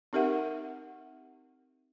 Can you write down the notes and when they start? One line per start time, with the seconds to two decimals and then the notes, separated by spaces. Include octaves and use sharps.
0.13 C4 D#4 G4 A#4 E5 F#5